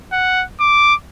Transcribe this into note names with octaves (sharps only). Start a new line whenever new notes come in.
F#5
D6